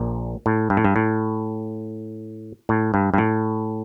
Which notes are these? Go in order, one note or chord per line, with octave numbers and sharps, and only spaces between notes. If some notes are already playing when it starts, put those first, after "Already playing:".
Already playing: A#1 A#2
A2
G2
A2
G2
A2
A2
G2
G2
A2